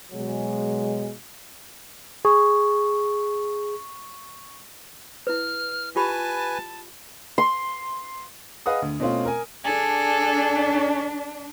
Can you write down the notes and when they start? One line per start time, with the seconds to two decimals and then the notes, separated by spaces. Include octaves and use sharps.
0.13 B2 F#3 G#3
2.25 G#4 C#6
5.27 E4 B4 F6
5.96 F4 G4 B4 G#5 A5 B5
7.38 C6
8.66 G#4 B4 D#5 F5 F#5 D#6
8.82 D2
9.00 B2 A3 C4 C#4 F4
9.25 A#4 G#5
9.64 D4 G#4 A4